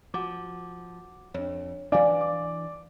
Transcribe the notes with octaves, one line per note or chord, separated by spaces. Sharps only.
F3 F#4 F#5 D6
F2 D4 C#5
E3 D4 D5 F5 G#5 D6
D6